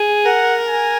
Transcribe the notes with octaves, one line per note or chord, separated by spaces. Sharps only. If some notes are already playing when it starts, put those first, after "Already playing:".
Already playing: G#4
A#4 F#5
G#5